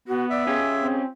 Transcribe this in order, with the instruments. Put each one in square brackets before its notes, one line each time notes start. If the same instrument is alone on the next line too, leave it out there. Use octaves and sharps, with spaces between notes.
[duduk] B3 [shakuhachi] F#4
[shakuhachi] D5 [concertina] E5
[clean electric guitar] C#4 F4 G4 [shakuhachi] G#4
[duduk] C4